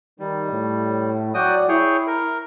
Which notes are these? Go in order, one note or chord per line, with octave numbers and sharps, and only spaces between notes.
D#3 G3
A2
F#3 F#4 D5 G5 D#6
E4 G#4 C#5 G5
A#4